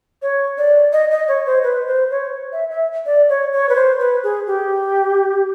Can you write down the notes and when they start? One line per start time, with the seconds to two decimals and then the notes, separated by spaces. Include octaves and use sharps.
0.22 C#5
0.58 D5
0.93 D#5
1.11 D#5
1.28 C#5
1.46 C5
1.63 B4
1.87 C5
2.11 C#5
2.53 E5
2.70 E5
3.06 D5
3.29 C#5
3.53 C#5
3.69 B4
3.76 C5
4.00 B4
4.24 G#4
4.47 G4